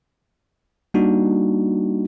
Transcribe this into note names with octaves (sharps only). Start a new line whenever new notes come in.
G3 A#3 D4 D#4 F#4